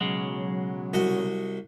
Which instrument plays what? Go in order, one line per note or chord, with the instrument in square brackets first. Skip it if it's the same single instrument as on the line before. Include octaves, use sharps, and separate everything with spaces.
[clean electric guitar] B1 C#3 G#3 [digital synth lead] F#3
[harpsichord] C2 F#4 D#5